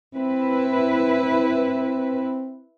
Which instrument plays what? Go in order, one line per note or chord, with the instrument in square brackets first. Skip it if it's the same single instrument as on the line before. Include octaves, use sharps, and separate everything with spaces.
[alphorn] C4 [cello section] E4 B4